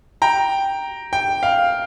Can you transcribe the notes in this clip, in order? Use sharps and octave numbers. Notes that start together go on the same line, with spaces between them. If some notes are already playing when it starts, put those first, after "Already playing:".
G5 A#5
G5
F5